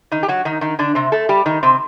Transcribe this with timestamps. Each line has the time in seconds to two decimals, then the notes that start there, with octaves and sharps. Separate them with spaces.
0.11 D#3 D#4
0.23 G4
0.28 F#3 F#4
0.45 D#3 D#4
0.61 D#3 D#4
0.79 D3 D4
0.95 C3 C4
1.12 A3 A4
1.29 G3 G4
1.46 D#3 D#4
1.63 C3 C4